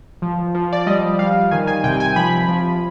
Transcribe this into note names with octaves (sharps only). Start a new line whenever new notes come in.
F3
F3
D5
G3 D#5
G3 F5
D#3 G#5
G#5
C3 G5
G#5
F3 B5
F3